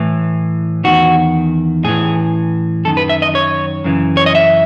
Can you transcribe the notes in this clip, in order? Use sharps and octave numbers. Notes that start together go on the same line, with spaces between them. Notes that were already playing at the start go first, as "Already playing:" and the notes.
Already playing: A2 E3
E2 D#3 F#4
A2 E3 G#4
F#2 D#3 A4
B4
E5
D#5
C#5
F#2 C#3 E3
C#5
D#5
E5